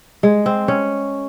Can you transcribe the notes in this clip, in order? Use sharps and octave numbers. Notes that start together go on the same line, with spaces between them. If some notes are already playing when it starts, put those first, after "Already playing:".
G#3
C4
C#4